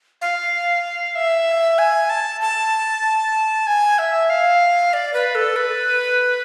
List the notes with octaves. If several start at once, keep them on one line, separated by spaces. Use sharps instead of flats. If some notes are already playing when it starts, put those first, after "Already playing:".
F5
E5
G#5
A5
A5
G#5
E5
F5
D5
B4
A4
B4